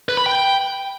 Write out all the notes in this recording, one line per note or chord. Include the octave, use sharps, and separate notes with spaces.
B4
B5
G5